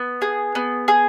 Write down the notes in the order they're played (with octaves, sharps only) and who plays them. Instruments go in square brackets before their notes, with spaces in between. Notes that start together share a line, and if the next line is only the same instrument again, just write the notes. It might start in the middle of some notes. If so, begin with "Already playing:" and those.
Already playing: [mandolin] B3
G#4
B3
G#4